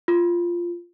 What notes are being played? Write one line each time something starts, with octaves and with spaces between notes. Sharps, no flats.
F4